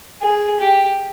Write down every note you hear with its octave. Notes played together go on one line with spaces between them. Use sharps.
G#4
G4